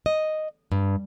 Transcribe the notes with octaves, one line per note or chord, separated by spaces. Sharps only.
D#5
G2